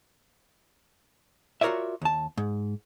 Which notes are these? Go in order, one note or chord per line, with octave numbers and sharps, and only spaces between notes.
F4 F#4 A#4 C#5 D5 E5
D#2 A5
G#2